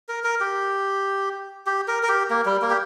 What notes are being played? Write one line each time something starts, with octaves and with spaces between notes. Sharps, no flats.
A#4
A#4
G4
G4
A#4
A#4
G4
A#3
G3
A#3
G4